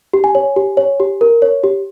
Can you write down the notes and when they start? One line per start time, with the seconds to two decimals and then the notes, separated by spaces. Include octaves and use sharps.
0.13 G4
0.24 G#5
0.35 C#5
0.56 G4
0.77 C#5
1.00 G4
1.21 A#4
1.42 C#5
1.64 G4